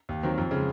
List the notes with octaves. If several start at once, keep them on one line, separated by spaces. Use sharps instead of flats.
D#2
D#3 F#3 C4
F2
C#3 G#3